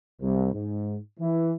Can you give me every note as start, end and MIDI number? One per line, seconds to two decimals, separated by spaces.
0.22 0.51 36
0.53 0.98 44
1.19 1.54 52